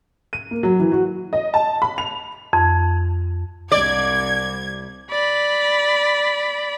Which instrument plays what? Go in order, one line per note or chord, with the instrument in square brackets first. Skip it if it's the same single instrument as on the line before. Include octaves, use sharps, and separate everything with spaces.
[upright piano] D#7
A#3
F#3
E3
F#4
[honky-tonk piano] D#5
A5
B5
F7
[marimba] F2
[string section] C2 G#6 [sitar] D5
[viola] D5 B5